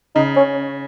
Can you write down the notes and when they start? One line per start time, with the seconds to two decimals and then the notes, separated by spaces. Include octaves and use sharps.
0.16 C#3 D#4
0.36 C#4